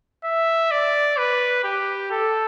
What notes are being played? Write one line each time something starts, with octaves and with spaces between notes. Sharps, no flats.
E5
D5
B4
G4
A4